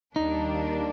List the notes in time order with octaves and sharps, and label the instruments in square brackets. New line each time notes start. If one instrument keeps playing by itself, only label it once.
[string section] D#2 D#3 G3 A#3 D4 [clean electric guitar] D#4